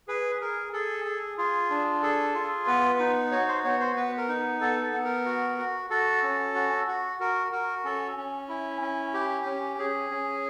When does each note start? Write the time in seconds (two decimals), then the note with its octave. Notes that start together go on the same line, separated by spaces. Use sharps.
0.08 G#4 B4
0.41 G#4 A#4
0.73 G#4 A4
1.05 G#4
1.38 F4 G#4
1.70 D4
2.02 G#4 A4
2.34 F4
2.67 B3 B4
2.99 D#4
3.31 F#4 C#5
3.48 C5
3.64 B3 C#5
3.80 C5
3.96 B3 B4
4.18 A#4
4.29 D#4
4.61 B3 A4
4.83 A4
4.93 B3
5.04 A#4
5.26 F#4
5.58 F#4
5.90 F#4 A4
6.23 C#4
6.55 F#4
6.87 F#4
7.20 F#4 A#4
7.52 F#4 A#4
7.84 C#4 A4
8.17 C#4
8.49 E4
8.81 C#4
9.14 G4
9.46 C#4
9.78 C#4 G#4
10.11 C#4